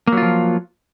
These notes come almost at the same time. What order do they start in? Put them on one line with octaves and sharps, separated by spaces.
A#3 F#3 F4 F3